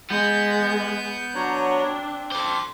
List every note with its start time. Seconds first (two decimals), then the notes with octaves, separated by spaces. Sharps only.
0.10 G#3 B3 G6
1.35 F#3 D4 C#5 A#5
1.86 C4
2.32 A4 C5 D6